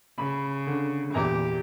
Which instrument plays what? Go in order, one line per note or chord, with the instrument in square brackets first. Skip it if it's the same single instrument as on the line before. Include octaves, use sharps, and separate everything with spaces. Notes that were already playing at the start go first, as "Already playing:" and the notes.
[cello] C#3 [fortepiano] B5
[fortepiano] D3
[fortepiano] E2 A#2 A#5 [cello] G4